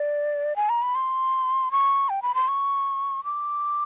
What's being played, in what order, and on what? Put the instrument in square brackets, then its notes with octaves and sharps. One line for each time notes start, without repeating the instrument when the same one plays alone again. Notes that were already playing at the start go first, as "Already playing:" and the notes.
Already playing: [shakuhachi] D5
G#5
A#5
B5
C6
C#6
G5
B5
C6
C#6
D6